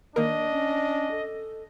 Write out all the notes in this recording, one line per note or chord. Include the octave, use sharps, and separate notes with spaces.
D#3 A#3 D4 A#4 D#5
C#4
A4